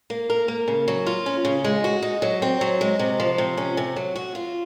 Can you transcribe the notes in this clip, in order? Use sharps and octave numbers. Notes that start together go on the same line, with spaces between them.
A#3
A#4
A#3
C#3
F#3
F4
C#4
C#3
G#3
F#4
D#4
F#3
C4
F#3
G#3
C3
F3
C3
C#4
C3
F#3
F#4
F4